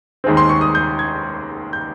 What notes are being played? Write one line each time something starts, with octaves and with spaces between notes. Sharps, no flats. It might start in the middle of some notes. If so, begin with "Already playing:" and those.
D#2 D#3 G#3 C4
C6
C#6
D#6
G6
G#6
G6